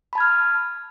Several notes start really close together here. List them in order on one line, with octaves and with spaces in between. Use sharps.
B5 A5 G#6 F6